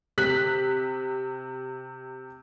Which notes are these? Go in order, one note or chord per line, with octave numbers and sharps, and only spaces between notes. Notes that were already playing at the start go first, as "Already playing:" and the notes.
C3 F#6 B6 F#7